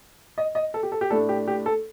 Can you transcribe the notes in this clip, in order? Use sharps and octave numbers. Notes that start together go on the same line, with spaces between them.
D#5
D#5
A4
G4
A4
G4
A2 A3 D4 A4
G4
G4
A4